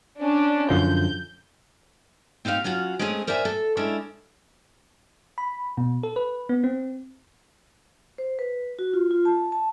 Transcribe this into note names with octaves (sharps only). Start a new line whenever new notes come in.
C#4 D4
F#2 D3 F3 G6
C4 D#4 E4 G4 F5
F#3 C#4 F4 F#4
G#3 A3 C4 C#4 G#4
A#4 C5 D5 E5 G#5
A4
G#3 C#4 D4 E4
B5
B2
A4
B4
B3
C4
C5
B4
F#4
F4
F4
A5
A5